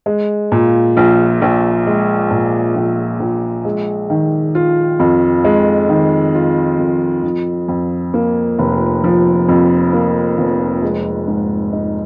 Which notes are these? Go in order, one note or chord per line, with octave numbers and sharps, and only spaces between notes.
G#3
A#2
A#1
A#1
G#3
A#2
A#1
A#1
G#3
D#3
F4
F2
G#3
D#3
F4
F2
F3
F2
A#3
F1
F3
F2
A#3
F1
G#3
G#2
D#4